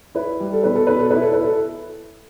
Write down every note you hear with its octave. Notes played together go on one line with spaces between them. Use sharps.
E4 B4
G3
A4
B2 B4
A4
B2 B4
A4
B4
E4
A4
B4
E4 A4